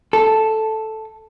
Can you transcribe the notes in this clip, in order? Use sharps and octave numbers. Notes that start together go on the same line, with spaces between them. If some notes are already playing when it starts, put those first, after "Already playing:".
A4